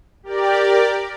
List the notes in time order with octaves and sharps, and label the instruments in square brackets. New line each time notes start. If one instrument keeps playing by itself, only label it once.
[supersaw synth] G4 A#4 D5